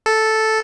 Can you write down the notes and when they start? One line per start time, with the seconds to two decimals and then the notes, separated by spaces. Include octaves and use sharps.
0.06 A4